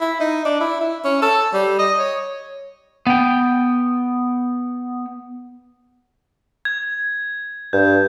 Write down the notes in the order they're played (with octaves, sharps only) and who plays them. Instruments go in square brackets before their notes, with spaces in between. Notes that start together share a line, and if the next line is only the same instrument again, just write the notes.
[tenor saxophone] E4
D#4
D4
E4
E4
C#4
A4
G3
D#5
C#5
[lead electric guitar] B3 G5
[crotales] G#6
[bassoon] G2 [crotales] G6